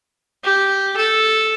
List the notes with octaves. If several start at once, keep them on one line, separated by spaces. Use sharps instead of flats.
G4
A4